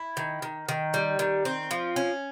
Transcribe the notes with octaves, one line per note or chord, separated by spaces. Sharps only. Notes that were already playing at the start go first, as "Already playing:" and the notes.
Already playing: E4
D#3
D#3
D#3
G3
D#3
C4
F3
C#4